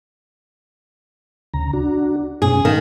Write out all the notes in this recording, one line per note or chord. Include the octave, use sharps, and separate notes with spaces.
D2 C#3 A#5
D4 F#4
F#2 B2 C#4 G#4
D#3 A4 F5